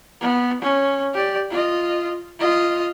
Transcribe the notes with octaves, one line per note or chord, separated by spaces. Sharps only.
B3
C#4
G4 D5
F4 D#5
F4 D#5